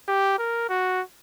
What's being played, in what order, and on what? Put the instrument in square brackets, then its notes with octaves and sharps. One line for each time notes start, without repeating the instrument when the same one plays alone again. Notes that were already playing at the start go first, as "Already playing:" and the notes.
[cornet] G4
A#4
F#4